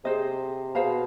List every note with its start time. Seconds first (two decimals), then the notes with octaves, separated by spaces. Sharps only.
0.04 C3 G#4 C5 D#5
0.75 B2 G#4 C5 F5 A#5